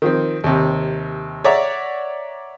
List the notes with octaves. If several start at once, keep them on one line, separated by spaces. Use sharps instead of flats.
D#3 F3 C4
D#2 C3
C#5 D5 E5 F#5 A#5 D6